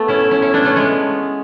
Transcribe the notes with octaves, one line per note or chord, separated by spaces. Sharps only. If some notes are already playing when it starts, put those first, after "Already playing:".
Already playing: A3 B3
C#4 E4
C#4 E4
C#4 E4
B3 D4
A3 C#4
G#3 B3